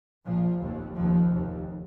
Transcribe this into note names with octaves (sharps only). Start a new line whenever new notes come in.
A#1 A#2 F3
F1 D#2
F1 D#2 F3
F1 D#2